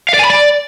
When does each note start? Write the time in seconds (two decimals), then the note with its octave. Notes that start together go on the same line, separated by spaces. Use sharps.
0.09 F5
0.14 D5
0.19 G#5
0.24 B5
0.30 D5